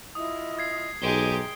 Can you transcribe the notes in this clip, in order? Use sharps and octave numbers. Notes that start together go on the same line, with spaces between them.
E4 F4 D#5 D#6
D#6 G#6 C7
B1 G#3 D#4 G4 D7 G7